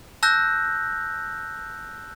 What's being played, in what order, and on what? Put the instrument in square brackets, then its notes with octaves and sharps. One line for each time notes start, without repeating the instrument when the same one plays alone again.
[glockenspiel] A5 E6 F#6 G6 A#6